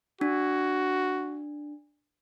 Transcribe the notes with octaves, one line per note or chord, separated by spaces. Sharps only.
D4 F#4